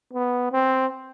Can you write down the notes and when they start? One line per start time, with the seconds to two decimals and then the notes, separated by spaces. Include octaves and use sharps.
0.13 B3
0.52 C4